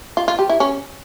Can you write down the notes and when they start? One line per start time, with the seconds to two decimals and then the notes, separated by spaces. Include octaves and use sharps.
0.17 F4
0.28 F4
0.39 G4
0.49 E4
0.60 C#4